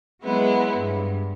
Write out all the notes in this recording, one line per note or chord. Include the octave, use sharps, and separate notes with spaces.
F#3 G#3 B3 E4
G2